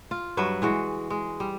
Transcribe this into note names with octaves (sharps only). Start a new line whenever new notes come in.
F4
G2 F#3 B4 E5
E3 G#3 F#4
G#3
G3